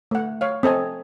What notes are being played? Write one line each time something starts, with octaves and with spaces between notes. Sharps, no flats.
A3 F#5
C#5 F5
C4 A4 D#5 G#5